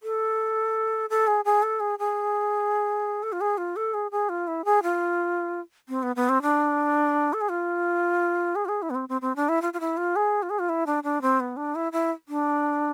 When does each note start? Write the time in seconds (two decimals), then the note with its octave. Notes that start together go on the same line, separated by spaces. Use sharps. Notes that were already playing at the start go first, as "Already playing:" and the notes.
0.03 A4
1.10 A4
1.27 G#4
1.45 G#4
1.63 A4
1.80 G#4
1.99 G#4
3.23 A4
3.32 F4
3.41 G#4
3.58 F4
3.76 A4
3.94 G#4
4.11 G#4
4.29 F4
4.48 E4
4.65 G#4
4.83 F4
5.89 C4
6.03 B3
6.16 B3
6.29 C4
6.42 D4
7.33 A4
7.41 G#4
7.49 F4
8.55 G#4
8.65 F4
8.69 G#4
8.82 E4
8.90 B3
8.95 C4
9.09 C4
9.21 C4
9.36 D4
9.49 E4
9.62 F4
9.73 F4
9.80 E4
9.97 F4
10.16 G#4
10.42 F4
10.50 G#4
10.59 F4
10.69 E4
10.86 D4
11.03 D4
11.22 C4
11.40 B3
11.57 D4
11.75 E4
11.92 E4
12.28 D4